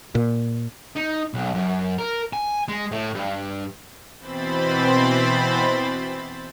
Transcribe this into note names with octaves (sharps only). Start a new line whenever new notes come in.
A#2
D#4
B1
F#2
A#4
G#5
G#3
A2
G2
B2 E3 C4 C5 B5 A6